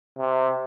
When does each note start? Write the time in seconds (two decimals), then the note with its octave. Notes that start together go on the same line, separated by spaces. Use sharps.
0.18 C3